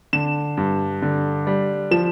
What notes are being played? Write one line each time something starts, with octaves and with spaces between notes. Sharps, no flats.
D3 E7
G2
D3
G3
F3 E7